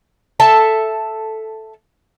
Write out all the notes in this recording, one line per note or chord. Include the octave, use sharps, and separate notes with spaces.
A4 E5 A5